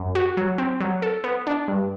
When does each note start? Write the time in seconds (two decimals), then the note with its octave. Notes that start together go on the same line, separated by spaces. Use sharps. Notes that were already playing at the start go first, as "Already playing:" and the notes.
Already playing: F#2
0.15 F#4
0.37 F#3
0.58 C4
0.80 F#3
1.02 A4
1.24 B3
1.47 D4
1.68 G2